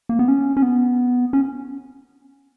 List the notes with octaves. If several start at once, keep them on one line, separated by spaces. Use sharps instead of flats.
A#3
B3
C#4
C#4
B3
C#4